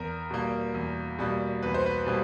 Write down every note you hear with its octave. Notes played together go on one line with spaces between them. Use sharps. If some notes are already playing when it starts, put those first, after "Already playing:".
Already playing: E2 A#4
B2 G3 A#3
E2
B2 G3 A#3
E2 B4
C5
B4
B2 G3 A#3